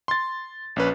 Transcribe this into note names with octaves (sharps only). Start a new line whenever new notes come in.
C6 A6
A#1 C#4 B4